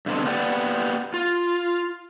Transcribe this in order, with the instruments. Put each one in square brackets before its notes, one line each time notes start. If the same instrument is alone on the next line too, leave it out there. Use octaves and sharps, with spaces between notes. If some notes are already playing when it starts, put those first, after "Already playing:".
[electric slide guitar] G2 B2 D3 C4
A#3 B3 G4 B4 D5 F#5
F4